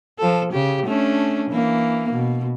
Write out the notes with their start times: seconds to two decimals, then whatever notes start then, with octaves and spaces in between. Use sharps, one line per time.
0.19 F3 A4
0.52 C#3 G4
0.86 A3 C#4 D4
1.51 E3 A#3
2.12 B2